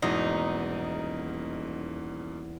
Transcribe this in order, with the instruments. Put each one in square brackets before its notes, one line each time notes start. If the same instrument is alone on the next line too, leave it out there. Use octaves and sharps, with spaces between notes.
[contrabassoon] D#1 [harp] E2 [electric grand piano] G#2 B2 [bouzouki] D#4